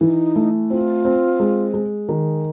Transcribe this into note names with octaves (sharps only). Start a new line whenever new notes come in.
E3 D#4
A3
C4 F4
C4
G#3
G#3
D#3